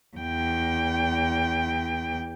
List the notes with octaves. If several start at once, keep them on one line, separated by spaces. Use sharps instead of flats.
E2 G5